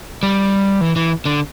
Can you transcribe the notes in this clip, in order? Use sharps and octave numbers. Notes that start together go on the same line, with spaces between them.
G3
E3
E3
D3